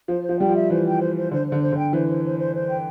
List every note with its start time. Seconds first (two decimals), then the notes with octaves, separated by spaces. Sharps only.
0.08 F3 C5
0.23 C5
0.29 F3
0.39 G3 G5
0.49 F3
0.54 E5
0.69 E3 C5
0.85 G5
1.00 C5
1.16 C5
1.31 D3 C5
1.46 C5
1.52 D3
1.62 C5
1.72 D3
1.77 G5
1.92 E3 C5
2.07 C5
2.23 C5
2.38 C5
2.54 C5
2.69 G5